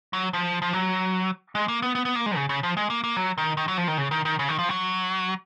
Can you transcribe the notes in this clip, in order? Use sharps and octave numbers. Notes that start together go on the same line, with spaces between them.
F#3
F3
F3
F#3
G#3
A#3
B3
B3
B3
A#3
G#3
C#3
C#3
F3
G#3
A#3
A#3
F#3
D#3
D#3
F#3
F3
D#3
C#3
D#3
D#3
C#3
D#3
F3
F#3